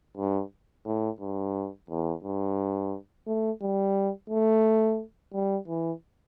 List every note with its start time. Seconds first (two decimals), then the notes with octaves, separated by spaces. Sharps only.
0.17 G2
0.86 A2
1.20 G2
1.90 E2
2.24 G2
3.27 A3
3.62 G3
4.30 A3
5.33 G3
5.68 E3